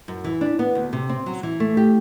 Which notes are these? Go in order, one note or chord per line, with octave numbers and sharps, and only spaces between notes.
F#2
E3
D4
B3
D2
C3
C4
F#3
E3
A3
G4